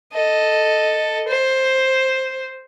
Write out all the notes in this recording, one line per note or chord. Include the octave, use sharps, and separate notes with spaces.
A4 D#5
C5